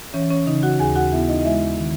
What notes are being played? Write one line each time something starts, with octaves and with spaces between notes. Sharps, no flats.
E3 C#4 C#5
C#4 C#5
C#3 D#4 D#5
F#4 F#5
D#2 G#4 G#5
F#4 F#5
B3 E4 E5
D#4 D#5
D#5
G#3 E4 E5
D#3